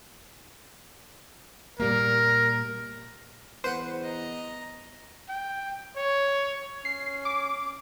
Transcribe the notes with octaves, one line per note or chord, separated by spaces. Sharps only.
A#2 G3 A#3 A#4
E2 B4 C5 F#5
D#5 A#5
G5
C#5
C#4 C7
D6